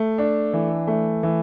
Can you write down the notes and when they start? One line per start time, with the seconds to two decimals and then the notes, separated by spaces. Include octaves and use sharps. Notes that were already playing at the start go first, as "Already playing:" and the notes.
Already playing: A3
0.18 D4
0.53 E3
0.87 A3
1.23 E3